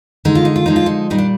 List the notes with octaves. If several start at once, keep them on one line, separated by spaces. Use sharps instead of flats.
D3 G#3 D#4
F4
D#4
F4
D3 F3 G#3 D#4
F4
D#4
A#2 G3 D#4
D4